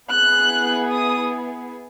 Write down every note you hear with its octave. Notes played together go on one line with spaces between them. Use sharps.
B3 E4 G#4 F#6
D#6